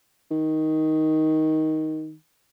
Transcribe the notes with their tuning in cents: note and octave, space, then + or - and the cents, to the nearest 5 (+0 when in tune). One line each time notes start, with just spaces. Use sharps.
D#3 +10